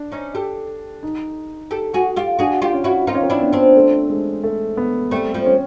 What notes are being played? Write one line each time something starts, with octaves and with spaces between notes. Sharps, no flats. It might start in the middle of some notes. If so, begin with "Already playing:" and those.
Already playing: D4
C#4 D#4
G4 A4
D#4
G4 A4
F#4 G#4
F4 G4
D4 F#4 G#4
F4 G4
C#4
E4 F#4
C4 D#4 F4
C#4
C4
D4 E4
B3
C4 D4
A3
G#3
A3
B3
G3 A3 C4
F3 G3
C#4